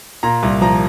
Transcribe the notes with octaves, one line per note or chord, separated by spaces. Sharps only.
A#2 A#5
C2
F3 A#5